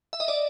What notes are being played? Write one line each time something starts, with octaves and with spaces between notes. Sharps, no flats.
E5
D#5
D5